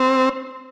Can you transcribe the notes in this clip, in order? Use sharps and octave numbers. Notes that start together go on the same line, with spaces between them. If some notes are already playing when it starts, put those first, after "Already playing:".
Already playing: C4